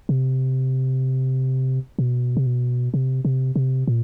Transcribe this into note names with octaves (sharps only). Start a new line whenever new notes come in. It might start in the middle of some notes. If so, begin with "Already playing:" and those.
C3
B2
C3
B2
C3
C3
C3
A#2